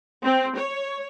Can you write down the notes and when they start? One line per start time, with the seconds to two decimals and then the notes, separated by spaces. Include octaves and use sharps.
0.23 C4
0.56 C#5